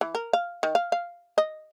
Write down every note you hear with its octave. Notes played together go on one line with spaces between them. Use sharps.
E3
A#4
F5
D#3
F5
F5
D#5